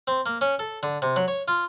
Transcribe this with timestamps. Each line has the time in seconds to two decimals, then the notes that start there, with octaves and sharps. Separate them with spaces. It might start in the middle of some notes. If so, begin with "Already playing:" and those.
0.08 C4
0.26 A#3
0.41 C#4
0.59 A4
0.83 D3
1.02 C3
1.16 F#3
1.28 C#5
1.48 F4